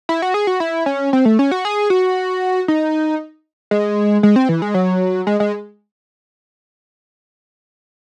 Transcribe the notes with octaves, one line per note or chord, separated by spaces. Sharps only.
E4
F#4
G#4
F#4
E4
C#4
C4
A3
C#4
F#4
G#4
F#4
D#4
G#3
G#3
C4
E3
G#3
F#3
G#3
G#3